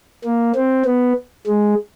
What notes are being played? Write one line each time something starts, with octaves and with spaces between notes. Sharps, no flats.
A#3
C4
B3
G#3